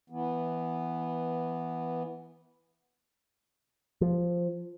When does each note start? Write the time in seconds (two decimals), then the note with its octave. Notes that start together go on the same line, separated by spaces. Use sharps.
0.10 E3 B3
4.01 F3